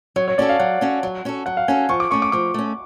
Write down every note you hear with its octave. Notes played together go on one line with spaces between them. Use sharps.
F#3 C#5
C#5
C#4 F#4 A4 D5
F5
F#3 F#5
C#4 F#4 A4
F#3
C#4 F#4 A4
F#3 F#5
F5
C#4 F#4 A4 G#5
F3 C#6
D6
A3 C#4 C#6
D6
F3 D6
A3 C#4